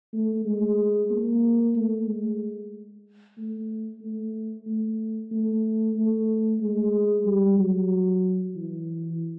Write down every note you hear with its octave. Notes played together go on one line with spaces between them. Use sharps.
A3
G#3
A#3
A3
G#3
A3
A3
A3
A3
A3
G#3
G3
F#3
E3